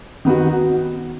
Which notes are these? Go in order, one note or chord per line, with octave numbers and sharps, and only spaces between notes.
D#3 B3 F#4